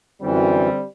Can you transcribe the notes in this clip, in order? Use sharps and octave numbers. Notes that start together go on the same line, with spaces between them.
F#2 D3 E3 G3 C4